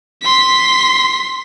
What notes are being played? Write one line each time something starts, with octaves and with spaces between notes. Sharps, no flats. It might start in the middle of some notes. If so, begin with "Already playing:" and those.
C6 B6